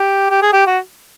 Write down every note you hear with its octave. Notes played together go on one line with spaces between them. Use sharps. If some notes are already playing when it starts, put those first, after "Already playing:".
Already playing: G4
G4
G#4
G4
F#4